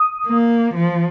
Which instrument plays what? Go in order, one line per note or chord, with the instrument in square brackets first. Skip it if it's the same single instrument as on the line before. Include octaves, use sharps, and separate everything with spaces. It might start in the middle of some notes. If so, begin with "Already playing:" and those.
Already playing: [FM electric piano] D#6
[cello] A#3
F3